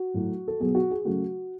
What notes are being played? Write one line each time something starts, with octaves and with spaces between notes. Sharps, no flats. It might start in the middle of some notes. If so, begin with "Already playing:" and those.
Already playing: F#4
A2 F#3 A3
A4
B2 F#3 B3 G#4
F#4
G#4
C#3 F#3 A3 F#4